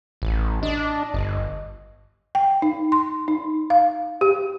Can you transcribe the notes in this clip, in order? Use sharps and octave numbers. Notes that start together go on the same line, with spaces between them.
A1
D4 D#5
G1
G5
D#4
C6
D#4
F5
G4